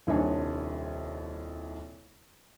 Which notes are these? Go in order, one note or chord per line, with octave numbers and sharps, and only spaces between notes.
D#1 C2 D4 D#4 C#5 G#5